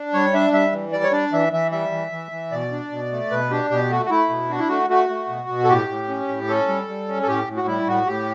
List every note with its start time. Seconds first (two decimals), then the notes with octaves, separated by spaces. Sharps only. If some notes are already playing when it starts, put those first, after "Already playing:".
Already playing: D4
0.13 G3 C#5
0.34 D4 E5
0.53 G3 E5
0.72 E3
0.92 G3 D5
1.04 C#5
1.12 D4 D5
1.33 E3 E5
1.53 E3 E5
1.72 G3 E5
1.92 E3
2.12 E3
2.31 E3
2.52 B2 D5
2.72 D4
2.92 B2
3.12 A3
3.31 B2 B4
3.50 D4 G4
3.70 B2 G4
3.90 A3 F#4
4.06 F#4
4.10 A3 E4
4.29 B2
4.49 D4 F#4
4.59 E4
4.69 A3 F#4
4.89 A3 F#4
5.09 A3
5.29 B2
5.49 B2
5.64 A4
5.69 A2 G4
5.89 A2
6.08 C#4
6.28 A2
6.48 C#4 A4
6.68 G3
6.88 G3
7.08 C#4
7.22 A4
7.27 A2 G4
7.48 A2
7.56 F#4
7.67 G3 E4
7.87 A2 F#4
8.07 A2 G4